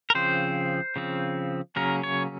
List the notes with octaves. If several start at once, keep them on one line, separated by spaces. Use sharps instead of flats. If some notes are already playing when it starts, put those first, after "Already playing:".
A#4
C#3 F3 C4 C5
C#3 F3 C4
C#3 F#3 A#3 C#4 A#4
C#5